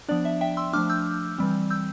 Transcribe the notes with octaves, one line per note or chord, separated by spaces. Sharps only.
F3 B3 D4 D5
E5
E5 G5
C6 E6
F3 A3 D4 D6 F6
E6 G6
E3 G3 C4
E6 G6